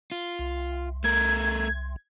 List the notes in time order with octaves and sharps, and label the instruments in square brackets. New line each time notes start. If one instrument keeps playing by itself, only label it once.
[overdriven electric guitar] F4
[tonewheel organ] C2
[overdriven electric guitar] A3 A#4 [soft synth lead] G#6